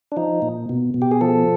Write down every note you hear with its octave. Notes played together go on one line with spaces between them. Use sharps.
D4
F3 D#4
A#2
B2
B2
G4
G#4
F3 A4